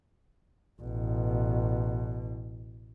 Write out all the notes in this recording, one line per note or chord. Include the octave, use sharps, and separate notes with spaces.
A1 B2